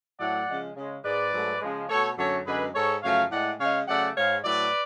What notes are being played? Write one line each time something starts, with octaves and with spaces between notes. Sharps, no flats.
A2 F#3 A3 D5 F#5
C#3 F3 G#3
C#3 G#3
G#2 G#3 B4 D5
G#2 F#3 A3
C#3 F3 G#3
B2 A3 A4 C#5
F#2 D3 F#3 A3 A4 C#5
F#2 D3 G#3 G#4 B4
G#2 G#3 A4 C#5
F#2 C#3 F3 A3 C#5 F5
A2 G#3 D5 F#5
C#3 G#3 C#5 F5
C#3 F#3 A3 D5 F#5
G#2 G#3 C#5 F5
A2 F#3 A3 B4 D5